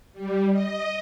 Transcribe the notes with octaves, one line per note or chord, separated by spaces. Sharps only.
G3
D#5